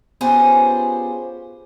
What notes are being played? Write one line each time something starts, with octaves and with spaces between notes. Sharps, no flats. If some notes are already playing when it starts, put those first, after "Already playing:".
B3 C#4 F4 G4 G#4 C5